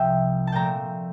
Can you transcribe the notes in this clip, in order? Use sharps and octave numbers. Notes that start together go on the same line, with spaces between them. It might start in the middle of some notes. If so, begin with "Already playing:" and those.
Already playing: C2 C3 F3 E5 G5
A5
A#2 F3 A3 C4 G5 A#5